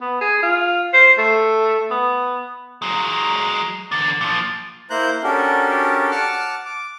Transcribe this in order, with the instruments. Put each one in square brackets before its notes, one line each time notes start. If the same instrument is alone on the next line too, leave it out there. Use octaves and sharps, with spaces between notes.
[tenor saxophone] B3
G#4
F4
C5
A3
B3
[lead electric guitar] F#3 G#3 [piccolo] A#5
[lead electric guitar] E2 D3 [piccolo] A6
[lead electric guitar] A#2 F3
[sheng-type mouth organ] A#3 E4 C5 A#5 F#6 G6
C#4 D4 F#4 G4 A4 A#4
F#5 A5 D6 F6
D6